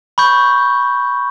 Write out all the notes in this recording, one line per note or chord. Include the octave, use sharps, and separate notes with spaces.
B5 C#6 G6